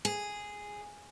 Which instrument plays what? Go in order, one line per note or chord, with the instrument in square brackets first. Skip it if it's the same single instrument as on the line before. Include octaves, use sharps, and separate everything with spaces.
[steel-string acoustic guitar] G#4